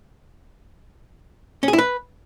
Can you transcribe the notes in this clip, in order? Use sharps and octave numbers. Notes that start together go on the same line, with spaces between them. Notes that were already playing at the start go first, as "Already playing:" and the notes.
C#4
G#4
E4
B4